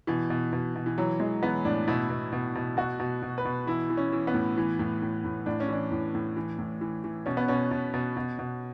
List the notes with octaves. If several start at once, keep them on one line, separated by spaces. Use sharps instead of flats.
B2 E3
B2
B2
B2
E3
E3 F#3
E3 G#3
E3 B3
A2 D4
B2 E4
B2
B2
B2
B2 F#4
B2
B2
B4
B2
E3 E4
E3
C#4
E3
B3
A2
E3
A2
A2
A2
A2 D4
C#4
E3 D4
A2
A2
E3
A2
E3
E3
B2 C#4
B3
B2 C#4
B2
B2
B2
B2